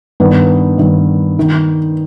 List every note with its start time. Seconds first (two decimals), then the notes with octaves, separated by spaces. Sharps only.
0.20 G2 D#3 B3
0.78 G2 D#3
1.39 D#3